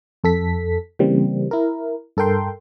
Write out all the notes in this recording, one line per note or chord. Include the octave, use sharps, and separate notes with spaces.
F2 A4 B6
C#3 E3 G3 A#3 C4
E4 A#4
G2 A4 A#4 G5 C6